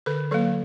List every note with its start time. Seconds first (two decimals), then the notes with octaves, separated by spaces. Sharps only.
0.06 D3 A4 B4
0.31 F#3 A#3 A4 B4